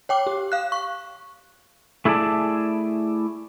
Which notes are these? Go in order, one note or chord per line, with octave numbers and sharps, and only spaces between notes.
C#5 G5 D6
G4
F5 F#6
C#6
A3 E4 G#4 A4 D5 A5